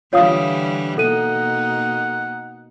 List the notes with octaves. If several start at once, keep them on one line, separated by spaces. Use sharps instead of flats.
D3 E3 G3 F4 C#5 F5 D#6
B2 A#3 D#4 A4 F#5 D#7